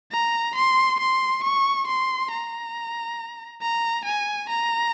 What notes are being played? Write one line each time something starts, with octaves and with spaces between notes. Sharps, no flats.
A#5
C6
C6
C#6
C6
A#5
A#5
G#5
A#5